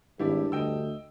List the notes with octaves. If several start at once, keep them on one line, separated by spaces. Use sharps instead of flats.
G#1 G2 E4 G4 D5
D2 D#5 G5 E6